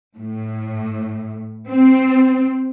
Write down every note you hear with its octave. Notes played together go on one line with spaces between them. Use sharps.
A2
C4